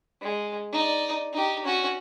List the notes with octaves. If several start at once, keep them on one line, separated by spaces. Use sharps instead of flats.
G#3
D#4 D5
D#4 G4
C#4 F#4